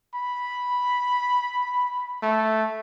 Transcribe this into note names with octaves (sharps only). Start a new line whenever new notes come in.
B5
A3